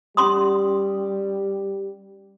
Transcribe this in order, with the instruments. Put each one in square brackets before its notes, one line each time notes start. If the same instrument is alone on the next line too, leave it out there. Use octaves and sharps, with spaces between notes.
[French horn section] G3 G4 [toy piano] C#4 C6 D#6